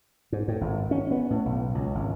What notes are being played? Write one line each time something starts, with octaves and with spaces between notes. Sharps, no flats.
G#2
A2
G#1
C#4
B3
A2
B1
C#2
G#1